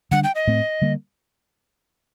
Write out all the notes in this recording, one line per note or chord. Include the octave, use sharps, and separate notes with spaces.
D3 G3 D4 F#5
G5
D#5
A2 A3 C4
D3 G3 A#3